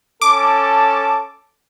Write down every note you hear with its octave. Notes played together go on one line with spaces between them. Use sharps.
C#4 A4 A5 D6